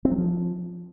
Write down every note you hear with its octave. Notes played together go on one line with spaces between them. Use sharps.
C4
F#3
F3